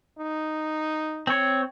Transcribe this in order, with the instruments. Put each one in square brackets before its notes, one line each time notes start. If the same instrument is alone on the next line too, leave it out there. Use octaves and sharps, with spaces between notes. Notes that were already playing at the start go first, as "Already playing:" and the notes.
[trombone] D#4
[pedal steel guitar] C4 C#5